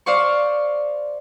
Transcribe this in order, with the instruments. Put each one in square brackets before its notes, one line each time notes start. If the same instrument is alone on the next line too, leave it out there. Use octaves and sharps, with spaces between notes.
[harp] C5 D5 F5 C#6